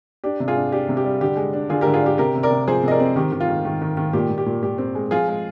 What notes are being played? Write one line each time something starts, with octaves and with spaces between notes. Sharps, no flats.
D4 G4
C3
F4 G#4
D4
D4 G4
C3
G4
G3
D3 G4
G#3
D4
D3 F4 G#4
D3 G4 A#4
F4 G#4
D4 G4
C3 G4 A#4
C3
A#4 D5
C3
F3 G#4 C5
C3 D#5
A#4 D5
C4
D#3 G4
D#3
F4
D#3
D#3
D#3
D#3
A#2 G4
A#2
G4
A#2
A#2 G4
C4
G#3
F3 F4 G#4
G#3